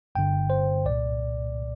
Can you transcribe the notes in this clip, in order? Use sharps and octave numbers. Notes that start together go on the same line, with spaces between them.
G1 G2 D3 G5
C5
C2 A#2 D5